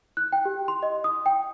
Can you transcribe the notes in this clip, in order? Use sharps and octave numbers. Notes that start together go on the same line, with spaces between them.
F#6
G5
G4
C6
D#5
D#6
G5